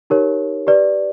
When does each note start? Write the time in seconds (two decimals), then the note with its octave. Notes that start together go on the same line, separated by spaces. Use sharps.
0.10 D#4 G4 A#4 C#5
0.67 G4 B4 D5